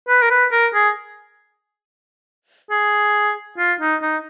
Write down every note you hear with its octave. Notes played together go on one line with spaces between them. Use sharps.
B4
A#4
B4
A#4
G#4
G#4
F4
D#4
D#4